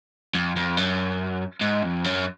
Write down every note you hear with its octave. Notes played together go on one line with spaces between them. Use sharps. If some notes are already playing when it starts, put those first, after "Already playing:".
F2
F2
F#2
G#2
F2
F#2